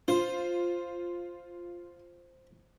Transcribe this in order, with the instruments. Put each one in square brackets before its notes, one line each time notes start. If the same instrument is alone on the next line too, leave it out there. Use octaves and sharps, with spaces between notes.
[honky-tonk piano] F4 [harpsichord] C5